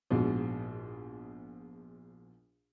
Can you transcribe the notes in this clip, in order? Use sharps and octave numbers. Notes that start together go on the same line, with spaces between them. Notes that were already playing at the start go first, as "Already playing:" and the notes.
A#1 G#2 B2